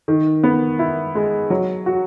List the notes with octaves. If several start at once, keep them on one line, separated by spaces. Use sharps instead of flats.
D#3
B3
E4
G#3
F#3
F#4